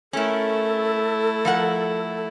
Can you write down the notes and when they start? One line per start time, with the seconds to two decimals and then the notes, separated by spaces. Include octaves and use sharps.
0.13 A3 C#4 E4 A4 A#4
1.45 F3 A#4 F#5